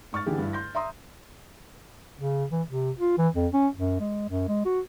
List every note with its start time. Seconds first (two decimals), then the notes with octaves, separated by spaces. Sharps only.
0.13 G#2 C#6 F6 A6
0.26 D3 E3 G4 G#4
0.38 G2 E4
0.53 C6 G6 A#6
0.75 E5 A#5 C6 D#6
2.19 C#3
2.51 E3
2.69 C3
2.98 F4
3.18 E3
3.35 F2
3.53 C#4
3.77 F#2
4.00 G#3
4.29 F#2
4.48 G#3
4.65 F#4